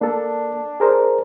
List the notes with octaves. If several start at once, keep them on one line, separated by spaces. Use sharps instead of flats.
A#3 D4 A4
G#4 A#4 C5